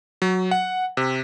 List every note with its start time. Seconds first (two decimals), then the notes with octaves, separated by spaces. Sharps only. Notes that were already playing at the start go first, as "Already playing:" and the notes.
0.22 F#3
0.51 F#5
0.97 C3